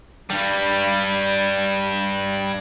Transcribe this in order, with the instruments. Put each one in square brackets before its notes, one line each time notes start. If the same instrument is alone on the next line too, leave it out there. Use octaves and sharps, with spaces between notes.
[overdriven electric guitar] G2 G3